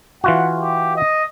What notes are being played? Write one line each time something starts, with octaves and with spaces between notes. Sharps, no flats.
E3 F4 F#4 F#5
G4
D#5